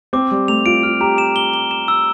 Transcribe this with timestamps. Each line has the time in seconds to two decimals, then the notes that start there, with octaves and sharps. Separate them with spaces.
0.13 C4 D6
0.31 G3 D6
0.48 A3 F7
0.66 F4 D7
0.83 F4 F6
1.00 G4 A#5
1.18 E7
1.36 G7
1.53 G7
1.71 E7
1.88 E6